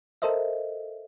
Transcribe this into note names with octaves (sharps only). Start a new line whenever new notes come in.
A4 A#4 C5 D#5 E5